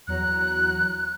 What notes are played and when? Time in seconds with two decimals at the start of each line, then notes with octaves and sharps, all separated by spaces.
0.07 E2 F#3 A#5 F#6